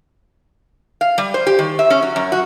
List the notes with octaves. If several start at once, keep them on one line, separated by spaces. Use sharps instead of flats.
F5
G3
C5
G4
D#3
E5
C#4
F#3
F#2
F#4